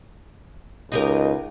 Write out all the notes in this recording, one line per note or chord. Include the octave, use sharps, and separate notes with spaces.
C#2 D#4 G4 A#4